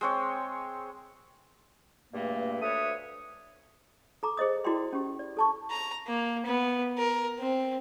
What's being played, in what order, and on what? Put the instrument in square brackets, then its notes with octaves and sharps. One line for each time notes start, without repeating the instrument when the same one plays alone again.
[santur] G#3 C4 C#5
[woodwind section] E2 G2 A#2 A3 A#3
D2 A3 D4 B4 C#5 D#6
[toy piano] A4 A#5 D6
G#4 C5 D#5 D#6
E4 F#4 A#4 D5 G5 C6
C#4 G4
D5
A4 A5 C#6
[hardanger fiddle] A#5
A#3
B3
A#4
C4